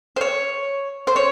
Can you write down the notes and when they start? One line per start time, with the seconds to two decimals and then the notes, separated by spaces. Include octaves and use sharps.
0.16 C5
0.21 C#5
1.07 C5
1.16 C#5